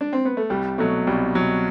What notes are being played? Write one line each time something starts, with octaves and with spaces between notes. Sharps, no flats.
D4
C4
B3
A3
C2 G3
B2 F#3 A3
C2 G3
B2 F#3